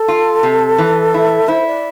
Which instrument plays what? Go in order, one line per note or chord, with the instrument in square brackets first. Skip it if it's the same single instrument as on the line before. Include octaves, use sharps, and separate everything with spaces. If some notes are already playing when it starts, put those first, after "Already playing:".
Already playing: [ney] A4
[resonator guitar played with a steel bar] F4
C3
E3
E4
[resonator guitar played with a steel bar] E4 [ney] C5
[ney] D5